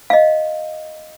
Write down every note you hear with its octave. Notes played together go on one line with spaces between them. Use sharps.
D#5 F5